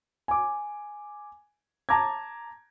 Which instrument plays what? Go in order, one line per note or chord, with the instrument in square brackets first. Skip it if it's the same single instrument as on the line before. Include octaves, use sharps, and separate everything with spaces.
[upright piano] G#5 D6
A5 A#5 D6 G#6